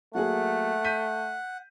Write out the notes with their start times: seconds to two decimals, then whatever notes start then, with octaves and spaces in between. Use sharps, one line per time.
0.15 F#3 A3 A#3 G#4 F#5
0.85 G6 B6 D#7